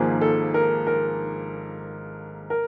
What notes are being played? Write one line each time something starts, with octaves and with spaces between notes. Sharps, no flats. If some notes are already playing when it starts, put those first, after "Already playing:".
Already playing: G#1 G#2 F3 A#3 G#4
A4
A#4
A#4
A#4